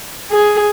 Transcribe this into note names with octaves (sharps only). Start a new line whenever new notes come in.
G#4